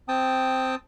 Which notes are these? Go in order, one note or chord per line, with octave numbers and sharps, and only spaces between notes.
C4 G5 A5 D#6